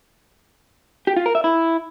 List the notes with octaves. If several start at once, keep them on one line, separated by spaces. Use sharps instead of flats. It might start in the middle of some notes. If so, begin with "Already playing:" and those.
G4
F4
A#4
E5
E4